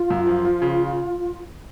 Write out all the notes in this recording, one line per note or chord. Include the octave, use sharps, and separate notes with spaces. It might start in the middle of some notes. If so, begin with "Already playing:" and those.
Already playing: F4
F#2
F3
F3
C#3